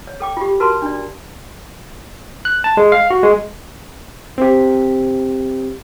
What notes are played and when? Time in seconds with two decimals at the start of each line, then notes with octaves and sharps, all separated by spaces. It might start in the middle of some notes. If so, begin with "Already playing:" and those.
0.07 C#5
0.20 A4 G5 D6
0.37 F4 G4
0.60 F#4 A#4 B4 A5 B5 C6
0.82 D4 D5
2.45 F#6
2.64 A5
2.77 G#3
2.92 F5
3.10 F#4
3.23 G#3
4.38 C4 G4